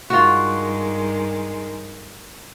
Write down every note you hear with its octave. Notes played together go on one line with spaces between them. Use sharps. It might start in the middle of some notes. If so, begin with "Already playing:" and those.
G2 D#3 G#3 F4 F#4